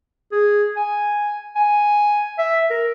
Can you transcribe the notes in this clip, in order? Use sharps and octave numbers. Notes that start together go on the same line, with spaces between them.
G#4
G#5
G#5
E5
A#4